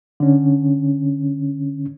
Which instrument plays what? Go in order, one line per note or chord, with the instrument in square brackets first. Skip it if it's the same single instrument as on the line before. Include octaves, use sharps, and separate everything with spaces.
[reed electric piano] D3 C#4